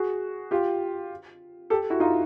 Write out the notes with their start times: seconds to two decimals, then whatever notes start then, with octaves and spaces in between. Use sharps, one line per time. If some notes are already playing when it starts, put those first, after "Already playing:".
Already playing: F#4 G#4
0.51 F4 G4
1.70 G4 A4
1.90 E4 F#4
2.00 D#4 F4